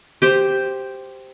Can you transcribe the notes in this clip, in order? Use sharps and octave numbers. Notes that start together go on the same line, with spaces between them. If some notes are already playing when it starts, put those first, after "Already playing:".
G4 C5